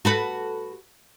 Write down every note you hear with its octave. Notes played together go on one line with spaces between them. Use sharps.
F#4 A4 B4